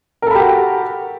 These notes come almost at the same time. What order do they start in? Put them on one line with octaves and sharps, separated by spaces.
A#4 A4 B5 G4 F#4